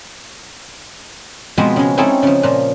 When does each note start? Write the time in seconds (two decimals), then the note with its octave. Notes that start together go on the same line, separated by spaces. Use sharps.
1.58 B2 F3 G#3 B3 C4
1.76 C#3 G#3
1.98 C4 C#4 D#4 E4 G#4 A4
2.23 C#3 F3
2.43 A#2 F3